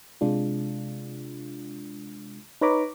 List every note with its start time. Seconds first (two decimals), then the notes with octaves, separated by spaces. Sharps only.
0.21 C3 G#3 D4 F4
2.61 D#4 B4 C#5 A#5 B5 D6